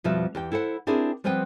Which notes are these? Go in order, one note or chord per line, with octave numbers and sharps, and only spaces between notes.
F2 B2 F3 G3 F#4 E5
E2 G4 G5
E4 A4 C5 F#5
C4 D4 E4 G4 G#4 A#4
F3 G3 B3 C4 B4 G5